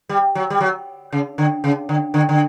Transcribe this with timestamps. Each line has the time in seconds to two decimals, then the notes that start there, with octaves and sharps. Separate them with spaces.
0.09 G3
0.35 F#3
0.50 G3
0.61 F#3
1.13 C#3
1.38 D3
1.64 C#3
1.89 D3
2.14 D3
2.29 D3